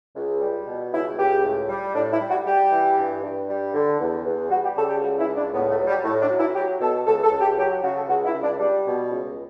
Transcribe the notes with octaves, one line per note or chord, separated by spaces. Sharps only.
C#2
G3
B2
C#2 E4
C#2 G4
A2
G3
A2 D4
E4
G3
F#4
G3 G4
E3
G2
G2
G3
D3
E2
E2
G3 F#4
G4
C#3 A4
G4
C#2 F#4
E4
C#2
D4
A2 B3
A3
F#3
G3
A2 A3
D4
F#3
E4
F#3 G4
B2 A4
C#2 A4
A4
C#2
G4
F#3 G4
F#4
C#3 F#4
A4
C#2 F#4
E4
C#2
D4
G3 D4
B2
C#2